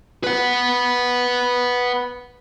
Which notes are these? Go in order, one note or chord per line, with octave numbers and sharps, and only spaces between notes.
B4 F#5